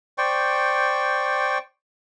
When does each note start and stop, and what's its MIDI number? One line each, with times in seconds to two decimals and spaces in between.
0.18 1.58 72
0.18 1.58 74
0.18 1.58 79
0.18 1.58 85